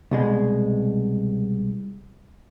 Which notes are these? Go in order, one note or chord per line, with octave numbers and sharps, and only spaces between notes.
C2 B2 G#3